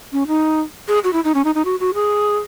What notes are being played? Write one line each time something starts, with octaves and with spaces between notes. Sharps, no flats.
C#4
D#4
G#4
F#4
E4
D#4
C#4
D#4
D#4
F#4
F#4
G#4